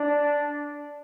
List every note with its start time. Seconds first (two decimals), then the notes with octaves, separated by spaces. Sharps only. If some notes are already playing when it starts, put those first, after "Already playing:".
Already playing: D4